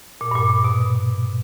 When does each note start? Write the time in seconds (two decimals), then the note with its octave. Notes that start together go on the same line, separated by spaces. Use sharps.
0.21 A#2
0.31 G2
0.35 A#2
0.50 A#2
0.64 B2